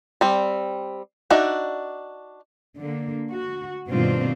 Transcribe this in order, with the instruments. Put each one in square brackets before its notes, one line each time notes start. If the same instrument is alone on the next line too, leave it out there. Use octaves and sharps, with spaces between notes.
[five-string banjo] G3 C4
D4 D#4 F#4 D5 E5
[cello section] D3 A#3
F#4
G2 B2 D#3 C4 D4 F4